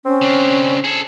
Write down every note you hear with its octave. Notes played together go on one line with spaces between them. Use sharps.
C4 C#4
C#3 D4
G#4 A4